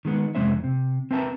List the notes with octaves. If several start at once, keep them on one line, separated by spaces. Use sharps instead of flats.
D#3 G#3 B3
F2 C3 G#3 C#4 C5 E5
C3
C4 A#4 B4 E5 A5 A#5